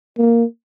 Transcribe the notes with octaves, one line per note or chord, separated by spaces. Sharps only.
A#3